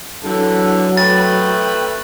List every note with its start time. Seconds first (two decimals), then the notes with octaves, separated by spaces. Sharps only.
0.24 D3 E3 F#3 A4
0.97 A3 B4 G5 A6